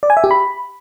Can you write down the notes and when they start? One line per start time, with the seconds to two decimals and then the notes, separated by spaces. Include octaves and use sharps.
0.03 D5
0.10 G#5
0.17 E5
0.24 G4
0.31 B5